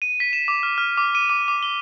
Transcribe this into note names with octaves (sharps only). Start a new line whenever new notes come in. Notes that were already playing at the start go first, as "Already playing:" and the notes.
D#7
B6
E7
D6
F6
F6
D6
D#7
D6
D6
G7